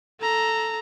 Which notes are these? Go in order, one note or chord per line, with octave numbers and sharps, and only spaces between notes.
A4 A#5